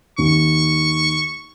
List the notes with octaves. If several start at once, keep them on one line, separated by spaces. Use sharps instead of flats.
D#2 C#6